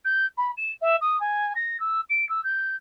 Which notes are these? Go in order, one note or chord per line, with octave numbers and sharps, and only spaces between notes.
G6
B5
E7
E5
D#6
G#5
A#6
E6
D7
E6
G6